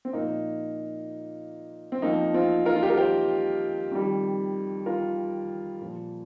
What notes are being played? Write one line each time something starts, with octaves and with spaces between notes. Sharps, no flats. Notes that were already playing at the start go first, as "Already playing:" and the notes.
C4
A#2 F3 A#3 D#4
C4
F2 F3 A#3 D#4
C4 F4
F4 A#4
F4
G4
A#4
G4 C5
F2 D#3 G3
F4 A#4
A#2 F3